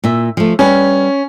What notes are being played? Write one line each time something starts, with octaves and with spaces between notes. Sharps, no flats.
A#2 E5
F3 A3
G3 C#4 B4